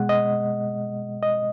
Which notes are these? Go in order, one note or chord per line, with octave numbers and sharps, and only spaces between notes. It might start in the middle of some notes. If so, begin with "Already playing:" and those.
Already playing: B2 G#3 F#5
D#5
D#5